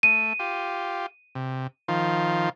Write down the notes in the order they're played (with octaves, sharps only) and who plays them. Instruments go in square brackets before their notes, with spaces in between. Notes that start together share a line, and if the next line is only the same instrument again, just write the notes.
[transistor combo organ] A3 [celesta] D#7
[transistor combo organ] F4 G4
C3
D#3 F3 F4